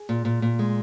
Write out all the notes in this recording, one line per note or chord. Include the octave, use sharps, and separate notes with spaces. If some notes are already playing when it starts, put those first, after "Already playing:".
Already playing: G#4
A#2
A#2
A#2
G#3